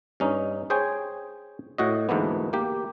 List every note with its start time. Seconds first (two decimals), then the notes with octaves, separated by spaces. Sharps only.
0.20 G2 C#4 D#4
0.70 G#4 C5 C#5 G5 G#5
1.78 A2 F#4 D#5
2.09 D2 G#2 E3 A#3 B3
2.53 A#3 G4